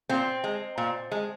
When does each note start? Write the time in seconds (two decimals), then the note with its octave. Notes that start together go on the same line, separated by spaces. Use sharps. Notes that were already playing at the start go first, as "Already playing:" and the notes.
0.09 A#2 C4
0.44 G#3
0.78 A#2
1.11 G#3